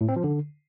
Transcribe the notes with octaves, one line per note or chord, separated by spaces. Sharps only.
A2
C4
F3
D3